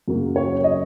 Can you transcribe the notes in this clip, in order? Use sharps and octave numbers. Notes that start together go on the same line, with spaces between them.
F#2 C#3 F#3 A#3
C#5
D#5